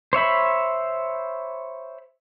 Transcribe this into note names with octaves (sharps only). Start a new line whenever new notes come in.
C5 C#5 E5 B5